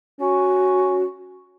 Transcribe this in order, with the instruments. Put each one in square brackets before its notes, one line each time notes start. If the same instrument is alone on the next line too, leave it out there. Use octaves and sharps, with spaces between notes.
[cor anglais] C#4 [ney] F#4